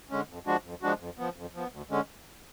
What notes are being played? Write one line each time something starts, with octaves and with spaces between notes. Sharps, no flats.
D3 G#3 C#4
F2
F3 G#3 D4 F#4
F2
F3 G#3 D4 F#4
F2
F3 B3
F2
F3 B3
D2
D3 G#3 C#4